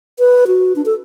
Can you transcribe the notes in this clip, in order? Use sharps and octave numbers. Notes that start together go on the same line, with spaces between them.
B4
F#4
D4
A4